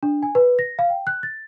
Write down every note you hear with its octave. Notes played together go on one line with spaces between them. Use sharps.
D4
G#5
B4
A#6
F5
G5
F#6
A6